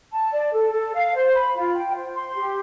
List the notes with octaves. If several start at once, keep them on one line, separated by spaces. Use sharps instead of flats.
A5
D5
A4
A4
F5
C5
B5
F4
G5
C5
C6
G4